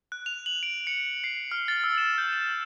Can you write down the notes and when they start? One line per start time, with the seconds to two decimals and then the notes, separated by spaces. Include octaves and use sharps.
0.12 F#6
0.26 F7
0.46 F#7
0.63 D7
0.87 C#7
1.24 C7
1.51 F6
1.68 A6
1.84 E6
1.98 E7
2.18 G6
2.33 E7